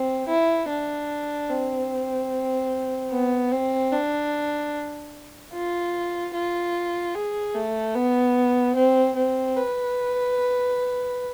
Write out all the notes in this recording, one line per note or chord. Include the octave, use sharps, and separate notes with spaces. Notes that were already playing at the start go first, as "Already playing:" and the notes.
Already playing: C4
E4
D4
C4
B3
C4
D4
F4
F4
G#4
A3
B3
C4
C4
B4